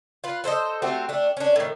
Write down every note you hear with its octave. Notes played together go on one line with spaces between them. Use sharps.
F4 B4
A4 C5 C#5 D#5
A3 C4 F#4 G4
A3 D4
C#4 D4
A2 D#3